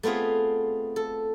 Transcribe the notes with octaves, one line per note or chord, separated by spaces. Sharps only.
A3 B3 C4 F4 G#4
A4